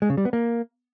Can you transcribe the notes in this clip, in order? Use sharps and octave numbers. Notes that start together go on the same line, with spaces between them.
G#3
C#3
G3
B3
A#3